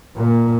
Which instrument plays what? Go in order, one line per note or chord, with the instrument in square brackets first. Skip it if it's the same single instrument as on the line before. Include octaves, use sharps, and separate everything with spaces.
[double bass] A#2